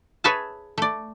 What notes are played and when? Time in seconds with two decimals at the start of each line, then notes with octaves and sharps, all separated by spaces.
0.24 G#4 B4 C#5 E5 G#5 A5
0.78 A3 D5